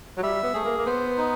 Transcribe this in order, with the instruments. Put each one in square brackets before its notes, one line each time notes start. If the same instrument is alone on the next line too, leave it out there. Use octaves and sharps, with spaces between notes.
[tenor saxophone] F#3
[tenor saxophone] G3 [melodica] E5
[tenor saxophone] B3
[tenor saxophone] A3 [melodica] G#4
[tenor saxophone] A#3
A#3
[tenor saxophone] B3 [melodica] C5
[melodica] D#4